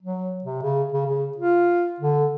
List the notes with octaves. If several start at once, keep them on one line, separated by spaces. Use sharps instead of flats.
F#3
C3
C#3
C#3
C#3
F4
D3